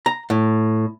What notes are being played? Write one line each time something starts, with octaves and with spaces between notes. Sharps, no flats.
A#5
A2